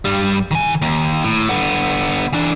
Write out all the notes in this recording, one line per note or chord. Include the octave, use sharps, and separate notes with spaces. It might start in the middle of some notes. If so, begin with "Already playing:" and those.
G2 G3
D#3 G#5
D#2
A2
D3 B3
E3 D4